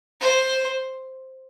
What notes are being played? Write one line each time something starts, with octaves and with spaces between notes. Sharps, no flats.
C5